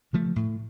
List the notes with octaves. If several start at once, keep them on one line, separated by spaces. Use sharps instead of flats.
C#3 F3 A3
A2